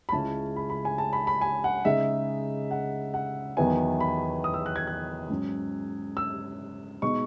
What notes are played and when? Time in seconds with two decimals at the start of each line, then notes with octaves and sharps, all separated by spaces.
0.09 B5
0.12 C#2 C#3 G#3 C#4 E4 A5
0.56 B5
0.70 B5
0.85 G#5
0.98 A5
1.13 B5
1.27 B5
1.41 G#5
1.64 F#5
1.85 C#3 G#3 D#4 E5
2.71 F#5
3.14 F#5
3.57 E2 D#3 F#3 B3 E4 G#5
4.00 B5
4.44 D#6
4.54 E6
4.66 F#6
4.76 G#6
4.87 F#6
5.29 G#2 F#3 C#4
6.17 E6
7.02 B2 G#3 D#4 C#6